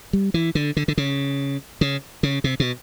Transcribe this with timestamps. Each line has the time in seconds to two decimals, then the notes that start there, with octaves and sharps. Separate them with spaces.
0.13 G3
0.34 E3
0.55 D3
0.77 D3
0.88 D3
0.98 C#3
1.81 C#3
2.23 C#3
2.44 C3
2.60 B2